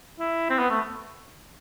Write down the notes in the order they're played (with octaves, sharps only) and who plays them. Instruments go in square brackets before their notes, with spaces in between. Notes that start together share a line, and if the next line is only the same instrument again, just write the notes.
[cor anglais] E4
C4
B3
A3